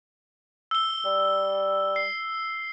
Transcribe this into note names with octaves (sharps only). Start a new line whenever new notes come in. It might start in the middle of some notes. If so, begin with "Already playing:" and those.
E6 G7
G3
C7